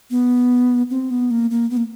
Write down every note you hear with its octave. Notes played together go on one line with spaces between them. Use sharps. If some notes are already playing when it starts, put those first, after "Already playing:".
B3
C4
B3
A#3
A#3
B3
A#3